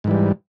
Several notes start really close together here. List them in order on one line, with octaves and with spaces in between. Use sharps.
G#2 E3 G3